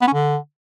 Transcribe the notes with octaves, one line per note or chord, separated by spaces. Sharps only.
B3
C#4
D3